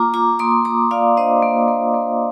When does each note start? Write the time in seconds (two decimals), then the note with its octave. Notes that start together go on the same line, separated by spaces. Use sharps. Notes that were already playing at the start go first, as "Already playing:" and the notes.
Already playing: A#3 F4 A#5 D6
0.14 F4 A#5 D6
0.39 A#3 C6 D#6
0.65 A#3 A#5 D6
0.91 F4 D5 F5
1.17 D4 C5 D#5
1.43 A#3
1.68 A#3
1.94 A#3